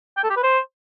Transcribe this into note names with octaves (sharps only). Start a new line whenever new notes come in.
G5
A4
G4
B4
C5